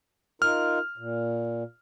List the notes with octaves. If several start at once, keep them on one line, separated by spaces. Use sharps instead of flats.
D#4 F4 A#4 F6
A#2